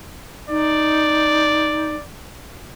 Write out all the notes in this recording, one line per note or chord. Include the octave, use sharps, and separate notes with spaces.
D#4 D5